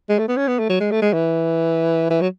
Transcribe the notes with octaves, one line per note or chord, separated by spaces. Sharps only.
G#3
A3
B3
C#4
B3
A3
F#3
G#3
A3
G#3
E3
E3
F#3